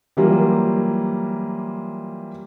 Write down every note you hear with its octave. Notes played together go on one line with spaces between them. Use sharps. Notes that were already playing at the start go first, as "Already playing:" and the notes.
E3 F#3 G3 A#3 F4